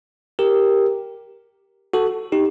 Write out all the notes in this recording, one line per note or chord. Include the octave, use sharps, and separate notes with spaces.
G4 A#4
F#4 A4
D#4 G4